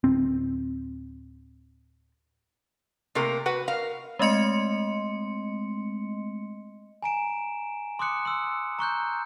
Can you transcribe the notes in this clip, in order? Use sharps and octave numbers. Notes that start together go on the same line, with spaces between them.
D1 C4
C3 A3 A#3 A#4
F#4 B4 F#5
A#4 F5
G#3 A3 C4 D#5 C6 C#7
G#5 A#5 D7 E7
C6 D6 D#6 F#6 C#7
C6 E6
A#5 C#6 F#6 G6